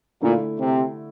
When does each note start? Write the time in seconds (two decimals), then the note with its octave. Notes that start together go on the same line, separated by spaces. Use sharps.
0.22 A#2 D3 A3 E4
0.60 C3